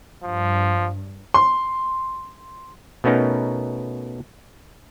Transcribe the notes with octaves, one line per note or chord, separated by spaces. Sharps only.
G2 F3
C6
B2 A3 B3 C#4 D#4 A#4